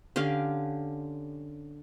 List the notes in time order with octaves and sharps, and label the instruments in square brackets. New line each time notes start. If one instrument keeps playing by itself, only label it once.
[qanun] D3 C#4 G4 F5